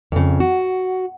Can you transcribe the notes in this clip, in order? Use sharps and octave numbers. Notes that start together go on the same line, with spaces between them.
F2 C#3
F#4